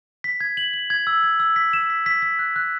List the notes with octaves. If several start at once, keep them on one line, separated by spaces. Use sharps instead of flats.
B6
G#6
F#7
F#7
G#6
E6
G#6
E6
B6
E7
B6
B6
B6
F#6
F#6